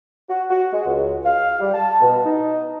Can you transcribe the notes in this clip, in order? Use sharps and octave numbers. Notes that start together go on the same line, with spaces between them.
F#4
F#4
G#3
C#2
F5
G3
A5
B2
D#4